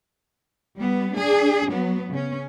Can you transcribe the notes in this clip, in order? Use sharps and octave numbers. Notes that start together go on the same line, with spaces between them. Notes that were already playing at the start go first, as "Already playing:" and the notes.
G3 B3
D4 G#4
F#3 B3
C#3 C#4